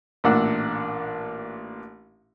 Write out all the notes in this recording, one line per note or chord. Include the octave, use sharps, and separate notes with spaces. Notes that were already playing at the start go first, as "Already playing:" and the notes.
A1 A#2 A#3 D4 F#5 E6